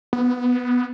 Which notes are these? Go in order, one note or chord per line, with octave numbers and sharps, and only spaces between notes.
B3